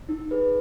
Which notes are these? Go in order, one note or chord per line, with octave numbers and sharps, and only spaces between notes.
D#4
G#4 B4